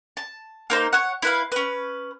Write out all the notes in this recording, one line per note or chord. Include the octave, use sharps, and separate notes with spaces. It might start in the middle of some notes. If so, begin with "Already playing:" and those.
A5
A#3 D#4 C5
C#5 F#5
E4 B4 F5
C#4 B4